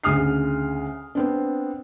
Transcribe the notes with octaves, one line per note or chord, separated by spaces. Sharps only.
D2 C#3 D#6 F6 C7
B3 C4 D4